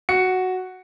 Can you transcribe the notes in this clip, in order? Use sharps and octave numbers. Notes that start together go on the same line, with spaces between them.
F#4 C#7